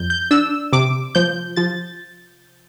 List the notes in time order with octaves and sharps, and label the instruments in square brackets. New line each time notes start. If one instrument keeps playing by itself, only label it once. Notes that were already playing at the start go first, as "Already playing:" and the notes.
Already playing: [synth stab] F2 G6
G6
D4 E6
C3 D6
F3 G6
F3 A6